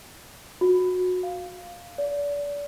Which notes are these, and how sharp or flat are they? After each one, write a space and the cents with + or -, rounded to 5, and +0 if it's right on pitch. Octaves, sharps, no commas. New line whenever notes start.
F#4 -25
F5 +0
D5 -30